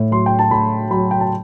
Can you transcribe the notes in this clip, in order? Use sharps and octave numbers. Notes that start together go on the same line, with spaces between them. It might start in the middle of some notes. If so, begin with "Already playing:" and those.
Already playing: A2
F#3 C6
G5
A5
A2 B5
F#3 B5
G5
A5